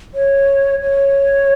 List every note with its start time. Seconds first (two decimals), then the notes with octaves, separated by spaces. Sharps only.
0.14 C#5
0.82 C#5